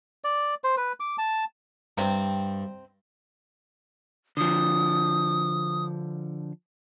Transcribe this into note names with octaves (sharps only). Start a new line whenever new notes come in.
D5
C5
B4
D6
A5
G2 C3 C4
D3 F3 D#6